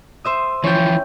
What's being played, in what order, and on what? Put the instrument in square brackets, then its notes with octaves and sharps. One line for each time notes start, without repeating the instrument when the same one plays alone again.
[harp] C5 E5 D#6
[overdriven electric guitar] E3 F3 [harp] C#4 G5